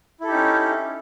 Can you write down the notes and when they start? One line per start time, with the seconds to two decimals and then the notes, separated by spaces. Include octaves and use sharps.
0.21 E4
0.24 A4
0.27 G4
0.30 D#4
0.34 C#4